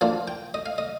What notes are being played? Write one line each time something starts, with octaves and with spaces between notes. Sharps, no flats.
F3 A#3 D4 F5
G5
D#5
F5
D#5